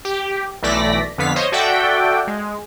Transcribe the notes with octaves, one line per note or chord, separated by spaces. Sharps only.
G4
B1 E3 A3 D5 A#6 B6
F2 D3 B3 F5 B6
C5 C#5 D#5
F#4 A4 D5 E5 F#5 G5
G#3